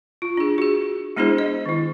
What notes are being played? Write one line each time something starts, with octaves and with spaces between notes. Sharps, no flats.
F4
D4 G#4
F#4 G#4
G#3 B3 D4 E4 G#4 C5
D#5
D#3 E4